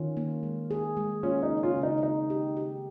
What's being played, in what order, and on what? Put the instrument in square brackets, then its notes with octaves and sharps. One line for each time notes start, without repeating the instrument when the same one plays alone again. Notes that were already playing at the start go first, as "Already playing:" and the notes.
Already playing: [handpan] D#3 [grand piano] C#4 F4
[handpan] A#3
G#3
G#4
G#3
[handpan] A#3 [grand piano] C#4 F4
[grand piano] D#4
[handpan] C#3
[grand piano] C#4 F4
[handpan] C#3
[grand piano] D#4
[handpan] C4 [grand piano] D#4
[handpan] G4
G4